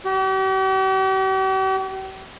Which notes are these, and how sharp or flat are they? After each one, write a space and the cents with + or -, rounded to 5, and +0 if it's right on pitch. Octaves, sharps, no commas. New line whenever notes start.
G4 -45